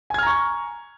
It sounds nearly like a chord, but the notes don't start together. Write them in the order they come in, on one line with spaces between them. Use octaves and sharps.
G#5 G#6 F6 A#5 C#6